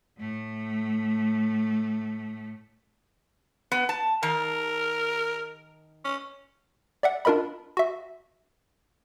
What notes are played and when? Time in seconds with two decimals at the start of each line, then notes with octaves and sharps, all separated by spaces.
0.18 A2 A3
3.72 B3
3.89 A5
4.23 D#3 A#4
6.05 C#4
7.03 D5 E5 F#5
7.25 D4 F4 A#4 D#5 B5
7.77 F#4 E5